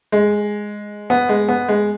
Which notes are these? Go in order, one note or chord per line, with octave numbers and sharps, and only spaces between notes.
G#3
B3
G#3
B3
G#3